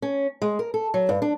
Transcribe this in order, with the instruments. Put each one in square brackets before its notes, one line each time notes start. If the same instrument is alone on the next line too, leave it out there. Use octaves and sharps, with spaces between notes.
[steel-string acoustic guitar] C#4
G#3
A#4
A4
F#3
G2
D4